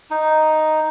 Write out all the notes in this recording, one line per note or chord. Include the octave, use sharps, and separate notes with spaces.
D#4